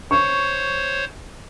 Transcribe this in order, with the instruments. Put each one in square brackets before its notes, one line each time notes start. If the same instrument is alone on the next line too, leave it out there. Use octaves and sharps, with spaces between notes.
[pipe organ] C5 C#5 [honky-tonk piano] C#6